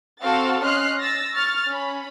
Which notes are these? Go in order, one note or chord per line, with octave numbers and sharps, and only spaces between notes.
C4 F#4 A4 F5 F#5 A6
C#4 D#5 C6 F6 F#6 C7
E6 A6 A#6
C#6 F6 A6
C#4 B5